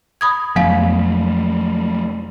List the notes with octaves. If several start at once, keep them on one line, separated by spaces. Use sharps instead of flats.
B5 D#6 G#6
F2 F3 F#3 A3 B3 F5